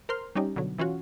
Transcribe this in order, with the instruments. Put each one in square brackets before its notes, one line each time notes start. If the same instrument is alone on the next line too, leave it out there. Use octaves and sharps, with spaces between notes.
[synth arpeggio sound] A#4 C5 C6 F6
G3 C#4 D#4 G4
B2 D3 F#3
E3 C#4 F4 F#4